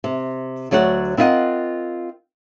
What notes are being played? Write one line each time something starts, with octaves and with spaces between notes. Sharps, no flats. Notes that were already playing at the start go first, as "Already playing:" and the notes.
C3
D2 F#3 C#5 D5 F#5
C4 E4 F4 A#4 D#5 F#5